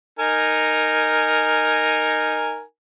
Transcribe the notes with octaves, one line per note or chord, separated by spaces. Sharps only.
D#4 A#4 G#5